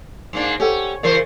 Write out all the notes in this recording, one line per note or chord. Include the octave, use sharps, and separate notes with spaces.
G#2 A#3 D4
C#4 G4 A4 F#5
C#3 E3 A#4 C5 D5